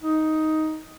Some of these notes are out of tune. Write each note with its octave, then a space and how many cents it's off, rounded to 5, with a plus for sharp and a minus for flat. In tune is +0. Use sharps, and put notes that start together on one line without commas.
D#4 +10